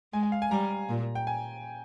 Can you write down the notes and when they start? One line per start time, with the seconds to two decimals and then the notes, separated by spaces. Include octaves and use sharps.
0.13 G#3 G#5
0.23 G#5
0.32 F5
0.42 G#5
0.51 G3 A#5
0.89 A#2
1.15 G5
1.27 G#5